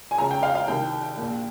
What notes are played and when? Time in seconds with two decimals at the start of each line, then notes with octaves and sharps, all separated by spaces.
0.11 G#5
0.18 C#2 C#3 A#5
0.31 G5
0.43 F5
0.55 F5
0.68 C2 C3 D#3 G5
1.17 A#1 A#2